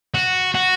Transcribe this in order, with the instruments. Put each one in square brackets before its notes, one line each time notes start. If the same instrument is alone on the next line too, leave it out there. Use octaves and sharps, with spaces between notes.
[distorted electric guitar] F#4
F#4